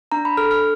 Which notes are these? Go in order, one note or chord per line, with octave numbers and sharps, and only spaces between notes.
D4 A#5
B5
A4 F6
F6